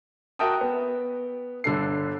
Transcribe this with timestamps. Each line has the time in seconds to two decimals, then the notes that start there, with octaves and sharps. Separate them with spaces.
0.39 F#4 A#4 E5 G5 A5 D#6
0.61 B3
1.64 G1 D3 D4 A4 C7